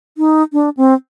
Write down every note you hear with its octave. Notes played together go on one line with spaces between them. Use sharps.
D#4
D4
C4